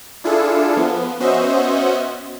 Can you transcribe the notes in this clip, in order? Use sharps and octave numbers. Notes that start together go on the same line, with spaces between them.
D4 E4 F4 G#4 A4
F3 B3
B3 C#4 F#4 C5 D#5 E5